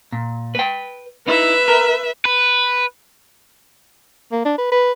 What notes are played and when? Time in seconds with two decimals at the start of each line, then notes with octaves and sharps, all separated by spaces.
0.12 A#2
0.55 B4 G5
1.27 D#4 E4 B4 E5
1.68 A#4
2.25 B4
4.32 A#3
4.45 D4
4.58 B4
4.72 B4